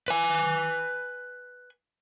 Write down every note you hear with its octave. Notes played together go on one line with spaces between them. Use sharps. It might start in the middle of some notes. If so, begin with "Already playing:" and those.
B4 G#5